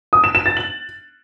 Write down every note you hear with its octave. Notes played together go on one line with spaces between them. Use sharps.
D#6
E7
E7
A6
F#7